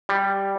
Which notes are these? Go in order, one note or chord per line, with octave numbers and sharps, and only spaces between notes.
G3